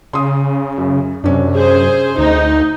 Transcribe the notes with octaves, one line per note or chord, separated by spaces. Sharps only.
C#3 C6 D#6
F#2
F#2 C3 C#4 D4
G#4 C5
D2 D#4